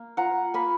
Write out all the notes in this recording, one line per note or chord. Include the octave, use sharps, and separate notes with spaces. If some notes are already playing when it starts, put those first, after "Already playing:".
Already playing: A#3
F4 F#5 A#5
A#3 G#5 B5